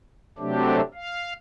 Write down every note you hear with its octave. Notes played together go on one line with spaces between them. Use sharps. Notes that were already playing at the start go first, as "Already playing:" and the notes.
C3 F#3 A3 C4 D4 G4
F5